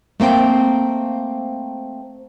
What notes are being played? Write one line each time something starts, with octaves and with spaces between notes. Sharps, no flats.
A3 A#3 C4 G5